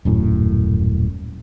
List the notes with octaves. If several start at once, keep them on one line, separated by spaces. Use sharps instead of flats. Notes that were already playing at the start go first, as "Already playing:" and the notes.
D#1 F#2 A2